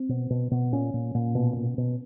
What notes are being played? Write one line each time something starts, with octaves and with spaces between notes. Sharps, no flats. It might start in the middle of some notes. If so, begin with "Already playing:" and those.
Already playing: C4
B2
B2
B2
A#2 C#4
A#2
A#2
B2
B2
B2